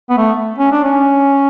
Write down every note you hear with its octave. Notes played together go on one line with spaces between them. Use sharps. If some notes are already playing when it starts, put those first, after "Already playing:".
B3
A3
C#4
D4
C#4